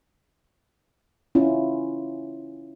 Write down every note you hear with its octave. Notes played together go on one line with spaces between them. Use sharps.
C#4 E4 F4